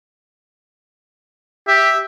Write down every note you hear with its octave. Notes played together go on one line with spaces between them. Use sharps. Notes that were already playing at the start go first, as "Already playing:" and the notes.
G4 E5